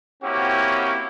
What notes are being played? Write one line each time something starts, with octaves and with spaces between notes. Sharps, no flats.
A#3 C4 C#4 E4 F#4 G4